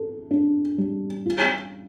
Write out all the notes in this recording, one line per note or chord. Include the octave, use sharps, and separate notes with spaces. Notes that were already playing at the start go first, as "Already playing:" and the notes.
Already playing: A4
D4
G3
F4